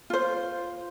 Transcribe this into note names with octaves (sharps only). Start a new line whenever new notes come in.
F4 C5